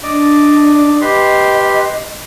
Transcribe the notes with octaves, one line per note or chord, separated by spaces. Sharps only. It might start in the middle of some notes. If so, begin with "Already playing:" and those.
D4 D5 D#5 D6
G4 B4 D#5 C6